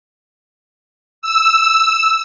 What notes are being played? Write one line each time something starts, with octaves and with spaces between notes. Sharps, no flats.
E6